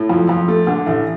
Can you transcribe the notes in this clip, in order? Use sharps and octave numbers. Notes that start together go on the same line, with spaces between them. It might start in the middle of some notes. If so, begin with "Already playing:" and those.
Already playing: A2
F2
F2
A3
D3
A1